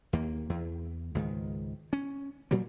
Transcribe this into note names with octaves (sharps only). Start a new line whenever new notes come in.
D#2 A#3
E2
C#2 G#2 D#3
C#4
A#2 F#3 G3 A#3